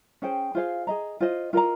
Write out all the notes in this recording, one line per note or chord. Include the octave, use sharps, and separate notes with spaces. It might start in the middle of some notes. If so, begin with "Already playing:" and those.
C#4 G#4 C5 G5
F4 G#4 C5 F5
G#4 D#5 A#5
F4 C5 D#5
F4 A#4 D#5 A#5